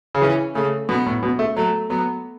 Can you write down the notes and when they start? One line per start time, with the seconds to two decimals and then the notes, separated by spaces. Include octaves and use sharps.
0.15 C#3
0.21 E3 C#4
0.55 C#3 A3
0.89 B2 B3
1.06 A2
1.23 B2
1.39 A3
1.56 F#3 A3
1.90 F#3 B3